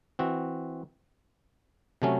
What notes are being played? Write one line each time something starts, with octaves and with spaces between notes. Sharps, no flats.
E3 C4 F#4
C3 F#3 A3 C#4